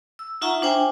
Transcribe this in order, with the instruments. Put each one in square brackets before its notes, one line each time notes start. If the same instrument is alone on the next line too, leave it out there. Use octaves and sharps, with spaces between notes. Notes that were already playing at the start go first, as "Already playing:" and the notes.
[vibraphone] E6
D#4 F4 E5 F#5 A#5 C#6
D4 C5 G5 G#5